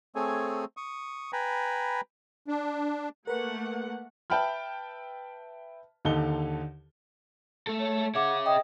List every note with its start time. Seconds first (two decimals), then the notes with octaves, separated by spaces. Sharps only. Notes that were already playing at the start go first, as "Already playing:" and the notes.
0.15 A3 C4 G#4 A4 C#5 G#5
0.77 C#6 D#6
1.33 B4 G5 G#5 A#5 B5
2.48 D4
3.27 A3 A#3 A#4 B4 F#5
4.30 B4 E5 G5 A5 B5 F6
6.05 D#2 D3 D#4 A4 G7
7.67 A3 A4
7.79 C#5
8.15 G#4 C#5 E5 F#5 D6
8.45 D#5 E5 G5 D#6